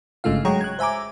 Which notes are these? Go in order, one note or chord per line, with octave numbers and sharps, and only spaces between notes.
G1 G#2 C#3 A3 F4 F5
F#3 G#3 C#5 F#5 G5 A#5
F#6 G#6
C5 E5 G#5 A#5 D6